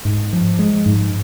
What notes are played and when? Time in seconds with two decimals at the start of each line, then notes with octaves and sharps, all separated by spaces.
0.05 G#2
0.33 F3
0.59 G#3
0.86 G#2